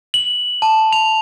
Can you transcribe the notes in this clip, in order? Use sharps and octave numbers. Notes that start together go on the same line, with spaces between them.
F#7
A5
F7